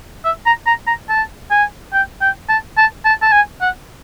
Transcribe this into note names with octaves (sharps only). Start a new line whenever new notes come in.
E5
A#5
A#5
A#5
A5
G#5
G5
G5
A5
A5
A5
A5
G#5
F#5